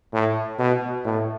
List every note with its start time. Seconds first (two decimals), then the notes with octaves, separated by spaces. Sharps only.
0.13 A2
0.59 B2
1.05 A2